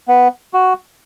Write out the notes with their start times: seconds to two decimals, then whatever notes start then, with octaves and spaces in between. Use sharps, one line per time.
0.08 B3
0.53 F#4